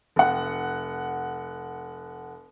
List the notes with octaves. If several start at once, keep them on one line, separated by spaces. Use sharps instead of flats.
F1 F#5